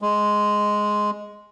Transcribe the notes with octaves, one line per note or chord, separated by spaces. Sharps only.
G#3